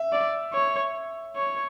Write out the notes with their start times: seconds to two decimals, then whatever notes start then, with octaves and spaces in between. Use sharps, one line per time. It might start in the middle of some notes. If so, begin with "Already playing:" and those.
Already playing: E5
0.12 D5
0.54 C#5
1.36 C#5